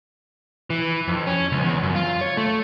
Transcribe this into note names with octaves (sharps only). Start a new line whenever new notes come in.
E3
F2
C#4
C#2
E2
F#2
F4
C#5
A3